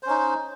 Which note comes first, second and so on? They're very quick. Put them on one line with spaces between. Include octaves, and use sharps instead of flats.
C5 C#4 D#4